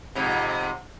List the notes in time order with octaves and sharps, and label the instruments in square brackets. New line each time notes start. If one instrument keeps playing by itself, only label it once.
[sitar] F2 G#2 C3